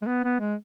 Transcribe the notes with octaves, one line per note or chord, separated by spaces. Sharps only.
G#3
B3
B3
G#3